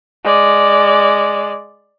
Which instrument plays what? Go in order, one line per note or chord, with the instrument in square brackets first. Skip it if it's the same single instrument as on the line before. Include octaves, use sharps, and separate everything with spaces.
[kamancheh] G#3 D5